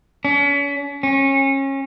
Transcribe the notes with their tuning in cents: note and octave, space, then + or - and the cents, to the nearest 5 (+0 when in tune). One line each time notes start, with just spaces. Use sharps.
C#4 +40
C#4 -25